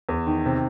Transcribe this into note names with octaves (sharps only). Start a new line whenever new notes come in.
E2
D#3
C3